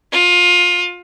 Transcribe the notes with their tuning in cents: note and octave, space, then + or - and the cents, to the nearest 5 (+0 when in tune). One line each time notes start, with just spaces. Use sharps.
F4 +25